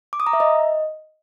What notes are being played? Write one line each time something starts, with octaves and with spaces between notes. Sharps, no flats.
D6
D#6
A#5
E5
D#5